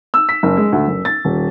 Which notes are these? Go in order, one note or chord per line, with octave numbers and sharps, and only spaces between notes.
E6
B6
F#1
G#3
D2
F#1
A6
D#1